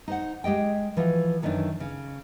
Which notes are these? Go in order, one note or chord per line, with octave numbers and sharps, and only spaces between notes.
D#4 C5 F#5
G#3 G4 D#5 G5
E3 F3 F#4
F#2 D#3 E3 C#4 D4
C#3